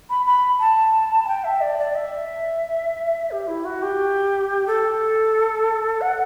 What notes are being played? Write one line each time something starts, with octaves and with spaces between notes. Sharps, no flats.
B5
B5
A5
A5
G5
E5
D5
D5
E5
G4
E4
F#4
G4
A4
F#5